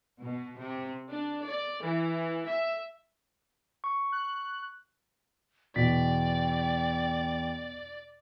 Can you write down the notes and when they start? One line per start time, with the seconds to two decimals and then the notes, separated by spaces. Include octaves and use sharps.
0.20 B2
0.58 C3
1.09 D4
1.44 D5
1.82 E3
2.47 E5
3.84 C#6
4.12 F#6
5.76 E2 B2 D5 G5 B6